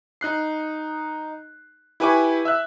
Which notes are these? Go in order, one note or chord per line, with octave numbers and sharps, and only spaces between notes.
D#4 F#6 C7
E4 G4 B4 G#5 C#6 D6
E5 E6 F#6